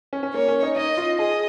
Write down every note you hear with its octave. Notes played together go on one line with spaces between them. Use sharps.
C#4
C#4
A#3 C#5
C#4
D#4
D#4 D#5
F4
G#4 D#5